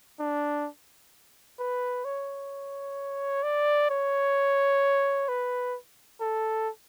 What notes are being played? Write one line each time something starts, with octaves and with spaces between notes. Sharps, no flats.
D4
B4
C#5
D5
C#5
B4
A4